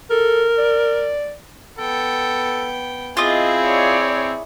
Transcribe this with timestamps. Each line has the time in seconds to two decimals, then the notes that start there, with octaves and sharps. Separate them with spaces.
0.10 A4 A#4
0.58 D5
1.78 B3 A4 G5
3.17 C4 E4 F4 G#4 D#5
3.64 C#5 D5